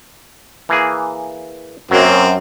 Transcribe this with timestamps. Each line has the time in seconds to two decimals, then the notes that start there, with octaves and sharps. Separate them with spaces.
0.69 E3 A#3 G#4
1.91 F#2 F#3 A#3 C4